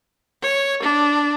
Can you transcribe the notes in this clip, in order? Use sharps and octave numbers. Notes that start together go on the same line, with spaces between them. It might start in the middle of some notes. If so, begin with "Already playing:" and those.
C#5
D4